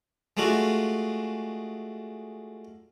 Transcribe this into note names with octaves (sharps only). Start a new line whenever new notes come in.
G#3 A3 D4 F4 F#4